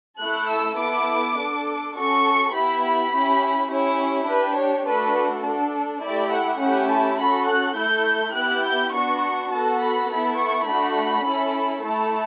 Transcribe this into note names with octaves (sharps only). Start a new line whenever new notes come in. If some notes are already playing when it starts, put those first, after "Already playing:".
A3 E4 A4 F#6
E6
B3 E4 A4 D6
D4 A4
C#4 F#4 A4 C#6
B3 E4 G4 B5
B5
C#4 E4 G4
C#4 E4 G4 C#5
D4 G4 B4
C#5
A3 D4 F#4 A4 B4
D4 A4
A3 E4 G4 D5
F#5
A3 C#4 E4 G4 F#5
A5
C#4 F#4 A4 B5
F#6
A3 E4 A4 G6
B3 E4 G4 F#6
G6
B3 D4 F#4 C#6
C#6
B3 F#4 A4 A5
B5
B3 E4 A4 B5
C#6
A3 D4 F#4 B5
C#4 E4 A4
A3 E4 A4 A5